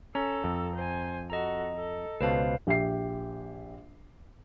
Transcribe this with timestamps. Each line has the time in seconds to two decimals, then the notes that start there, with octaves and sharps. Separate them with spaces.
0.15 C#4 A4 A#5 E6
0.44 F2
0.75 C5 G#5
1.30 F#4 A4 D#5 A#5
1.75 A4
2.21 C#2 B2 B4 C5 F5 A5
2.67 A#1 G4 E5 G5 C7